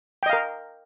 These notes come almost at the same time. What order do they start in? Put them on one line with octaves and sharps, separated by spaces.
G5 D#5 F5 A#4